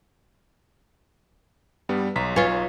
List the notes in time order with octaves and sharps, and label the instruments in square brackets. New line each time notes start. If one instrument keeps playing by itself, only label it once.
[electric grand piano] G2 G3 B3
B1 A#5 B6
[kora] F4 C#5 [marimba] B4 G#5